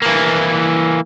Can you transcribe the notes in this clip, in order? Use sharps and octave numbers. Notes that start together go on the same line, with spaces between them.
E3 A#3